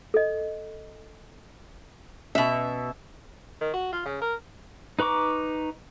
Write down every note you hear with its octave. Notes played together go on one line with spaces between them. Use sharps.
A4 D#5
B2 C#4 E5
D#3
F#4
F4
C#3
A#4
D#4 B4 A#5 C#6 D6